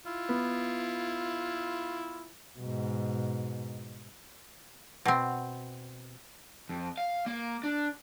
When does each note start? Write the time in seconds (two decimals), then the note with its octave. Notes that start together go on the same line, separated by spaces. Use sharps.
0.06 E4 F4
0.29 B3
2.59 G#2 B2
5.05 B2 C4
6.69 F2
6.98 F5
7.26 A#3
7.64 D4